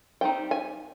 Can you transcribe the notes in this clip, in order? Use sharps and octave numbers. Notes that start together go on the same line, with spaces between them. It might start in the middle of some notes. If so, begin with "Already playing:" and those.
G3 C4 D#4 G5
G#5